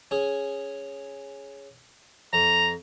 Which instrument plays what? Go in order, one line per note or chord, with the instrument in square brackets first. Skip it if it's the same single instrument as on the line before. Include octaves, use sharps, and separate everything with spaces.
[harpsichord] C#4 G#4
[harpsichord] F2 [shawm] A#5